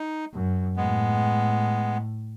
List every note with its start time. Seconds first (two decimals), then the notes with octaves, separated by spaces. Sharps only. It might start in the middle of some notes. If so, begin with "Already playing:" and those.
Already playing: D#4
0.33 F#2
0.76 A2 G#3 B3